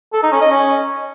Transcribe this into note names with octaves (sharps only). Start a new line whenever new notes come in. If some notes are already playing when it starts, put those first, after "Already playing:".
A4
D#4
C#4
D#5
C#4